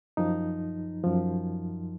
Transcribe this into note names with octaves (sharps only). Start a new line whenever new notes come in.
F#2 F3 D#4
F#2 F3